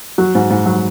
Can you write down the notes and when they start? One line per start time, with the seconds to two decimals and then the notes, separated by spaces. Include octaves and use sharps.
0.18 F#3 F#4
0.35 G#2
0.50 G#2
0.66 F#3